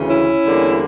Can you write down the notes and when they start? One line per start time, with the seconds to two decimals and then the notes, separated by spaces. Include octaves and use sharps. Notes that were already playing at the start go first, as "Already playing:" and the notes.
Already playing: D2 C#3 E3
0.09 C#4 E4
0.44 E2 D3 G3 A#3